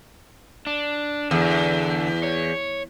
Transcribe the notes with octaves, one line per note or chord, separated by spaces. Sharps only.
D4
E2 D3
C#5